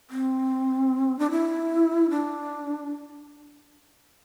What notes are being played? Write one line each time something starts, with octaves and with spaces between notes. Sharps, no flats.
C4
D4
E4
D4